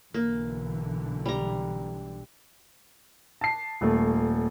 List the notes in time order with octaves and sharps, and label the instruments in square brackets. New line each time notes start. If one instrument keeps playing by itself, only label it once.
[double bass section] B1 D3 E3 [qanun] A#3
[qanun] G3 A#5
[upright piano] A5 C7
D#1 A3